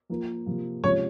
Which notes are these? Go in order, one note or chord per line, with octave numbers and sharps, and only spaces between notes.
F3 A#3 F4 A#4
C3 F3 A#3
C3 F3 G#3 C#4 C#5